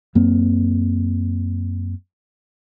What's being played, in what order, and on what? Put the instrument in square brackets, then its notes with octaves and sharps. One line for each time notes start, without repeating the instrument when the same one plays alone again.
[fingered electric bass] F#2 A#3 C4